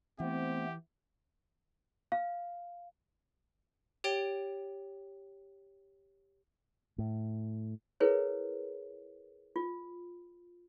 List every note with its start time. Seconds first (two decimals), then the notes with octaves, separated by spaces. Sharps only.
0.20 E3 A3 B3 C4 G4
2.12 F5
4.04 G4 C#5 G5 A6 D7 G7
6.98 A2
8.00 E4 G#4 A#4 B4 C#5
9.56 F4